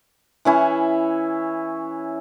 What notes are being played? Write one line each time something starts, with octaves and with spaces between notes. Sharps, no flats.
E3 C#4 E4